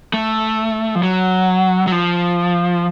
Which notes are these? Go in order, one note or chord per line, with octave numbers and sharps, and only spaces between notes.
A3
F3
F#3
F#3
F3